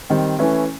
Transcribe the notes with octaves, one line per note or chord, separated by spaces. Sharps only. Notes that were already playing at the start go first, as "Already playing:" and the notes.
D#3 G3 C4
E3 A3 C#4 E4